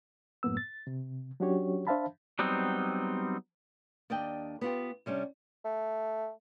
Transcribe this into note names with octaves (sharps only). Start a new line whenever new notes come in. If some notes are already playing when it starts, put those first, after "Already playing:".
F#2 A2 A#3 B3 E6
A6
C3
F#3 C#4 D4 F#4 G4 C#5
D4 C5 E5 F5 A5 B5
F#3 G3 B3 C4 D#4
D#2 D4 D5 D#5 G5
B3 F4 G4
C3 G3 C#4 D4
A3